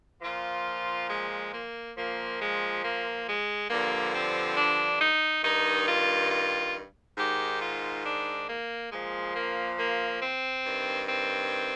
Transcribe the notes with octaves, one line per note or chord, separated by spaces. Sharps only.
A#2 F3 F4
G#3
A#3
A#2 F3 A#3
G#3
A#3
G#3
G2 D3 F3 A#3
C4
D4
D#4
G2 D#3 D#4
F4
F4
G#2 D#3 G4
F4
D4
A#3
A#2 F3 G#3
A#3
A#3
C4
G2 D#3
C4